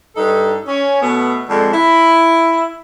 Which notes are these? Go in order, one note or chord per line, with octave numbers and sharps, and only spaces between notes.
G2 D#4 A4
C#4
B2 A3 B3
F2 D3 G#3
E4